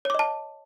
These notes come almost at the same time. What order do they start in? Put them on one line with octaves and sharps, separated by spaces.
C#5 D6 D#5 A5